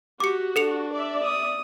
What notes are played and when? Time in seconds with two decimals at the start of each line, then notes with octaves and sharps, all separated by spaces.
0.20 F#4 G4 D6 C#7
0.56 D4 A4 C#7 F7
0.93 D5 E5
1.23 D#6